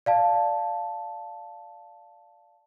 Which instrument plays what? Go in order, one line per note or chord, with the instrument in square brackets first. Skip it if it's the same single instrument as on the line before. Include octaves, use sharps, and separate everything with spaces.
[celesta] D5 F5 A5